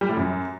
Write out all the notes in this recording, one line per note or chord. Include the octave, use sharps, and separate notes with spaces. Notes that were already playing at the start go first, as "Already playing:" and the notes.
G3
A2
F#2